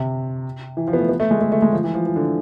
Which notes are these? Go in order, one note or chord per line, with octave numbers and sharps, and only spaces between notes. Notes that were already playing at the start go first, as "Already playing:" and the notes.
Already playing: C3
E3
F3
B3
A3
B3
A3
G#3
A3
A3
G#3
F3
E3
F3
E3
D3